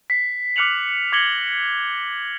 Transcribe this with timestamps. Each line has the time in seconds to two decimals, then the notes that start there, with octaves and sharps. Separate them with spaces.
0.10 B6 C7
0.56 D6 F6 F#6 C#7 F7 F#7
1.12 D6 G#6 A#6 C#7 F#7 G7